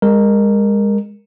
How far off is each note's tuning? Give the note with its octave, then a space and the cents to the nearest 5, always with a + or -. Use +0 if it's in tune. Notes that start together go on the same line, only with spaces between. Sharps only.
G#3 -25 A#4 +0